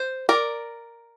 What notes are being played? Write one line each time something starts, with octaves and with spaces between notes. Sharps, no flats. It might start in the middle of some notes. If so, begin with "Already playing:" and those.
Already playing: C5
A#4 D5